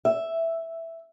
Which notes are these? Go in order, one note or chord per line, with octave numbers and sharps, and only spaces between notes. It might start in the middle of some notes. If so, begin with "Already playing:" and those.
E5